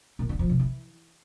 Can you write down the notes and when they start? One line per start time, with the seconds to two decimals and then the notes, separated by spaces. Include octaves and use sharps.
0.19 A#2
0.29 D3
0.39 F3
0.49 C3
0.59 E3